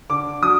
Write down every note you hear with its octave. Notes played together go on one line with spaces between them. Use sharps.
D3 D6
F#3 D#6